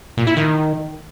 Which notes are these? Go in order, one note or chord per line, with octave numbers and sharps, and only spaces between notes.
A#2
E4
D#3